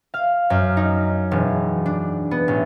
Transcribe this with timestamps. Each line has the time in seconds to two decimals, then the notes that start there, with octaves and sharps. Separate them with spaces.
0.14 F5
0.50 F#2
0.77 D#4
1.31 E1
1.86 D4
2.31 B3
2.48 A1